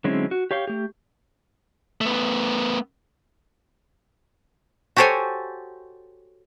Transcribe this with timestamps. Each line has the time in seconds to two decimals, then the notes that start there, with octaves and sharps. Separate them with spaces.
0.04 D3 F#3 G#3 C4 C#4 E4
0.31 F#4
0.51 G4 C#5 F5 G5
0.67 A3 G4
2.01 A3 B3
4.96 F#4 G4 A4 C5 C#5 G#5